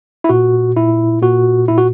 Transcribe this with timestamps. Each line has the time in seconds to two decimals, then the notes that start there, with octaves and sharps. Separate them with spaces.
0.24 E4
0.29 A#2 F#4
0.76 A#2 E4
1.22 A#2 F#4
1.68 A#2 E4
1.78 F#4